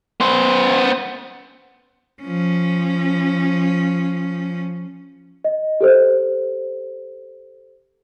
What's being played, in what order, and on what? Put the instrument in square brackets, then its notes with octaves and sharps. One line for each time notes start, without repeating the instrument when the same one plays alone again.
[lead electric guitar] B3 C5
[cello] F3 C#4
[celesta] D#5
G4 A4 C5